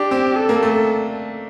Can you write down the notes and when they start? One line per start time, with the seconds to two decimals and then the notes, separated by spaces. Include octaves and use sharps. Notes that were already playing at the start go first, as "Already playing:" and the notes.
Already playing: D4 G4
0.11 C4
0.37 A4
0.49 A#3
0.63 A3